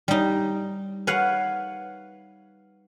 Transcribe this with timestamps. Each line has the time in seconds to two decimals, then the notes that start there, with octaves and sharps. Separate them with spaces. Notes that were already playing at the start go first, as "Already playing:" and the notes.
0.08 G3 D#4
1.07 B4 C#5 F5 F#5